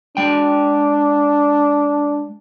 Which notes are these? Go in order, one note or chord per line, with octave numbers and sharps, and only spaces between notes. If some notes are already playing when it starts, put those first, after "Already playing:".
G#3 D4 G5